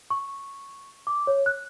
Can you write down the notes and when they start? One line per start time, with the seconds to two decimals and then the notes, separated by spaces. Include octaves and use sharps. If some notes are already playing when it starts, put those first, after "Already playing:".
0.10 C#6
1.07 D6
1.27 C#5
1.46 F#6